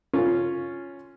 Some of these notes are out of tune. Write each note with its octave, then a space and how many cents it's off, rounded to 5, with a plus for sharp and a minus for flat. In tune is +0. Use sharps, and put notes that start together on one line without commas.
C#4 +0 F4 +0 A4 +45